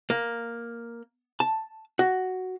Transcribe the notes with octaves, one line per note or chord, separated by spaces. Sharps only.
A#3
A5
F#4